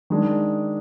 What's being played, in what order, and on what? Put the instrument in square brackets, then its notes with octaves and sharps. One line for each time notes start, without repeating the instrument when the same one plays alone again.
[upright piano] D#3 G#3 D4